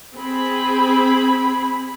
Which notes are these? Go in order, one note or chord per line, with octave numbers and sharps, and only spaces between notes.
C4 G#4 B5